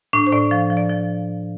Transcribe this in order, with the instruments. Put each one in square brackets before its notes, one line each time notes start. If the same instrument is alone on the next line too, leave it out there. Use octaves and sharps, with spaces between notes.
[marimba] A2 D4
C5
A2 D5
F3 F5
F3
D5
F3